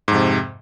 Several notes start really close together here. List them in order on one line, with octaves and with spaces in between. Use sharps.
G#2 F2 C3